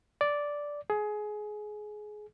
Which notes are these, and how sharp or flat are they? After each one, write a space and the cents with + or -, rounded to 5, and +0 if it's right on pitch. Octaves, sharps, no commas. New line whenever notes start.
D5 -5
G#4 +20